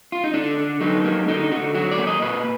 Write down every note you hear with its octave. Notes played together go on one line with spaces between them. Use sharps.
F4
D#4
D3 D4
D3
F#3 D#4
A#3
D3 D#4
D3 F#4
F#3 F#4
D5
A#3
D#5
A#2 B4